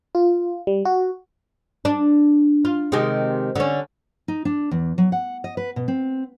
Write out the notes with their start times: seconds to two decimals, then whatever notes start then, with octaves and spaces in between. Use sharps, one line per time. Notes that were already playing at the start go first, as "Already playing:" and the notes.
0.15 F4
0.67 G3
0.85 F#4
1.85 D4
2.65 F4
2.92 C3 D#3 G#3
3.55 D3 C#4
4.28 D#4
4.45 D4
4.71 E2
4.98 F#3
5.12 F#5
5.44 D#5
5.57 B4
5.76 B2
5.88 C4